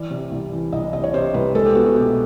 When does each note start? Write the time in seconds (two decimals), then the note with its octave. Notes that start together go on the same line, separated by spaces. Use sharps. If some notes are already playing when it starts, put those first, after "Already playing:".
Already playing: E3 D5
0.11 C3
0.31 C2
0.52 E3
0.72 C2 D#5
0.93 C3 D#5
1.04 C#5
1.14 C3 C5
1.34 C2 B4
1.55 G#3 A4
1.65 G4
1.75 B3 F#4
1.86 F#4
1.96 B2 G4